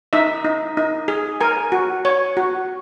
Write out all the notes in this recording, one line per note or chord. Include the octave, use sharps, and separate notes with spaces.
D#4 E5
D#4
D#4
G#4
A#4 G#5
F#4
C#5
F#4